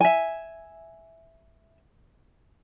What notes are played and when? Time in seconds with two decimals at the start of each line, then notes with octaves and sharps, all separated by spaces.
0.01 E5 G#5